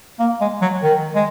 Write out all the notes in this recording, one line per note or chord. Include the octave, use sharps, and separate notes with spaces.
A#3
G#3
F#3
D#3
G#3